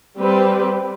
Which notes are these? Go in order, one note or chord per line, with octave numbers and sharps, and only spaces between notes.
G3 C4 G4 B4